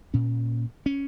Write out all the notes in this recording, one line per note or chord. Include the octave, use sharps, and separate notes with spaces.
A#2 C#4
C#4